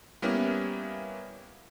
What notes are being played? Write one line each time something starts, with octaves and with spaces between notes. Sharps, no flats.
G3 A#3 B3 C#4 E4